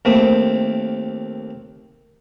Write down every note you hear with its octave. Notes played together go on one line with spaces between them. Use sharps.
D#2 A3 A#3 C4